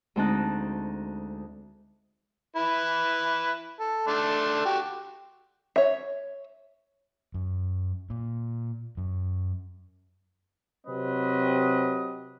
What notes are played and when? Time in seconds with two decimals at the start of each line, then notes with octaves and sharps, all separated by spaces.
0.16 D2 G#3 C4 D#4 A5 F#6
2.56 E4 B4
3.80 A4
4.07 A3 D4 C6
4.66 F#4 G4
5.76 C#5 E5
7.34 F#2
8.10 A#2
8.97 F#2
10.87 C3 F#3 C4 G4 B4 D#5